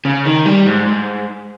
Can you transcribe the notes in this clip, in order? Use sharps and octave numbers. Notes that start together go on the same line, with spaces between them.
C#3
D#3
G3
G#2
G#2